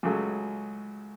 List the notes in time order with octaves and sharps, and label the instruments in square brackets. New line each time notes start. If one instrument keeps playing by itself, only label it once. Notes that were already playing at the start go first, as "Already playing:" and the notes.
[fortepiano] C#2 C#3 F#3 A3